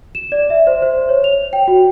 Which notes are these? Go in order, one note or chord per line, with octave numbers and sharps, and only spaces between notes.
E7
D5
E5
C5
C5
C#5
F7
G5
F#4